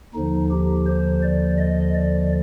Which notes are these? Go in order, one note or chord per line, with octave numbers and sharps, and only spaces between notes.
D#2 D3 F3 D#4
G4
C5
D5
D#5
D5